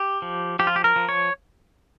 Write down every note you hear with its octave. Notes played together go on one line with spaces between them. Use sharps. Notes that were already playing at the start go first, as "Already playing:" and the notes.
Already playing: G4
F3
F3 G4
F4
G4
A#4
F3
C#5